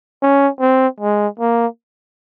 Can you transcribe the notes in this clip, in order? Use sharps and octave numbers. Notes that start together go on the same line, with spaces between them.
C#4
C4
G#3
A#3